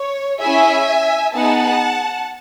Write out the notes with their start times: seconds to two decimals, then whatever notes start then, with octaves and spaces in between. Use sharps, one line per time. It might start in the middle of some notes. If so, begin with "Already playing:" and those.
Already playing: C#5
0.41 C#4 E4 G#4 E5 G#5
1.35 B3 D#4 G#4 F#5 A5